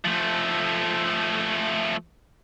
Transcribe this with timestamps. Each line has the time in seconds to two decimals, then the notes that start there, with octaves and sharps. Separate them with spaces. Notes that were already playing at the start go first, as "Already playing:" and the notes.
0.05 F3 A3